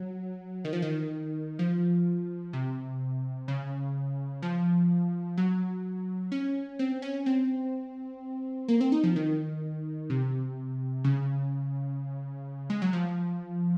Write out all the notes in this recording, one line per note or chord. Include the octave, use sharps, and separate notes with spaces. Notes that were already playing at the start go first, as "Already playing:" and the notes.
Already playing: F#3
D#3
F3
D#3
F3
C3
C#3
F3
F#3
C#4
C4
C#4
C4
A#3
C4
D#4
F3
D#3
C3
C#3
G#3
F#3
F3